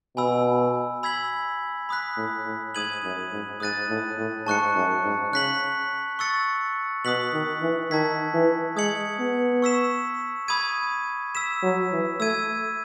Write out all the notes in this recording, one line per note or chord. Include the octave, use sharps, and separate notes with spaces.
B2 G#5 B5 E6
B5 E6 G#6 B6 F#7
B5 D#6 F#6 B6
A2
A2
G#2 D#6 G#6 D#7 F#7
F#2
G#2
G#2 D#6 F#6 A6 D#7
A2
A2
G#2 A5 C#6 F#6 C#7
F#2
G#2
C#3 F#6 B6 F#7
C#6 E6 A6 C#7
B2 D#6 F#6 B6 F#7
D#3
E3
D#3 A5 E6 G#6 B6
E3
G#3 D#6 G#6 C#7 F#7
B3
C#6 E6 B6 E7
B5 D#6 G#6 D#7
E6 B6 E7
F#3
E3
A3 E6 G#6 D#7